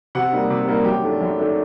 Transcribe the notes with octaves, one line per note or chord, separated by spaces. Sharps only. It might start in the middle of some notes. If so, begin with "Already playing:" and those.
C3 F#5
G3 A#3 D#4
C3
G3 A#3 D#4
F#2 G4
D#3 A3 D4
F#2
D#3 A3 D4